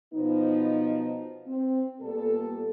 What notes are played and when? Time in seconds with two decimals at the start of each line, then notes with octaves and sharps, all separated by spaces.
0.14 B2 F3 B3 D#4
1.47 C4
2.01 A#2 G3 B3 A4